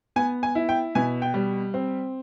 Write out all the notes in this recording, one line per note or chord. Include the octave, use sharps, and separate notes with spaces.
B3 G#5
G#5
E4
G5
B2 G#5
G5
G3
C4